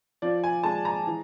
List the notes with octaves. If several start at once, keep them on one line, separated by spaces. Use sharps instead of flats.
F3 D5
G#5
G#3 A5
A#5
E3